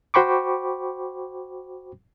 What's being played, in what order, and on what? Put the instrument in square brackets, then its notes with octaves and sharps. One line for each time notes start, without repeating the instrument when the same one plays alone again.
[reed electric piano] F#4 C5 G5 B5 C#6 D6